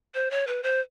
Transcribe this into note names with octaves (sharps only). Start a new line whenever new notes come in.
C5
C#5
B4
C5